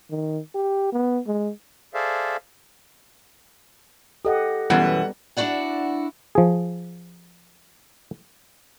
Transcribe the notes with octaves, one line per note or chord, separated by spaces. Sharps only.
D#3
G4
B3
G#3
G#4 A4 C5 D5 E5 F5
G4 A4 D#5 F#5
F#2 B2 E3 G3 B3 F#5
D4 E4 F#4 D5 F#5
F3 G#4